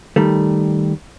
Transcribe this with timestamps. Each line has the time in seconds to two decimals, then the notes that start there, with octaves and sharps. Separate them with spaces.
0.16 D#3 G3 A3